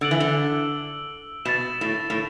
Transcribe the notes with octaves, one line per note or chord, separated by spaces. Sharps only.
D3 E6 D7 F#7
E3
D3
B2 A6 E7
A2
A2